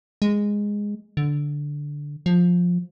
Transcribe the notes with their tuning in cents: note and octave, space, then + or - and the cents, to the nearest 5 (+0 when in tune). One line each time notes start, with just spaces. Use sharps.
G#3 -10
D3 -5
F3 +15